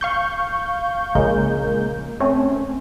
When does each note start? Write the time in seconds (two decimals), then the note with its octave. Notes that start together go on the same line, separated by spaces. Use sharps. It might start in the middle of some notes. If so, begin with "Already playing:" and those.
0.01 F5 C#6 G6
1.15 A#1 C#3 G#3 A#3 A#4 G6
2.20 A3 C4 C#4